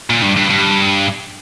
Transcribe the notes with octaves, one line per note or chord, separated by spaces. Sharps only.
A#2
G2
G2
G2